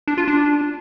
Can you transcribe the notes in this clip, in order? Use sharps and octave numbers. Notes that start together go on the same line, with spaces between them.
D4
F4
D4